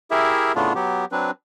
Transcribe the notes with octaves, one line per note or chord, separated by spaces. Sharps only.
E4 G4 G#4 A#4 E5
A2 C#3 A3 B3 D4 F4
F#3 B3 G4
F#3 C4 D4 B4